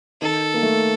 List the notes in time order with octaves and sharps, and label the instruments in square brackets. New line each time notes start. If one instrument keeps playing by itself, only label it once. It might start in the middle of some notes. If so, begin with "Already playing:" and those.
[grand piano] D#3 [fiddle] A4
[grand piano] A#3
A3